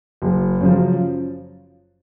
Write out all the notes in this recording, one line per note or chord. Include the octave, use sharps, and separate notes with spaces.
F#1
F#2 C#3 F3